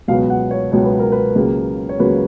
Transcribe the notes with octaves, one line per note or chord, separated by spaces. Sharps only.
C#2 B2 F#3 B3 F5
F#5
C#5
C#2 B2 F#3 B3 C#5
B4
A#4
B4
C#2 C#3 F#3 A#3
C#5
C#2 C#3 F#3 A#3 B4